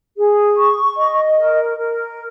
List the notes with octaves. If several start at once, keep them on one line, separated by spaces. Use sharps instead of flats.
G#4
C#6
D#5
A#4
A#4